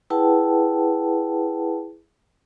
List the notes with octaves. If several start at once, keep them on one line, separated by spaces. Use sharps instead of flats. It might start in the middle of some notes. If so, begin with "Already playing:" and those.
E4 G#4 B4 F#5 G5 A5